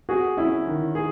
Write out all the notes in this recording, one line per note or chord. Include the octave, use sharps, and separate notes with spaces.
F#4 G#4
C#4 E4
D#3
G#4